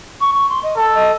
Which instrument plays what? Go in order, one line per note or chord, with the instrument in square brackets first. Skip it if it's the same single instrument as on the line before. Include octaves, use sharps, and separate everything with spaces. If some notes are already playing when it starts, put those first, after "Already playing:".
[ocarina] C#6
C#6
C6
D#5
[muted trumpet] A4
[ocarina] D#5